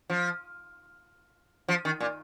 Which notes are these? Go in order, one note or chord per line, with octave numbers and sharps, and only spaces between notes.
F3
F3
D#3
A#2